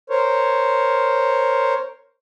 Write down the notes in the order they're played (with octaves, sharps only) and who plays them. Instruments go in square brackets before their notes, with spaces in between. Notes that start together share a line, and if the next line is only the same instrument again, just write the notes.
[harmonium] A#4 C5 C#5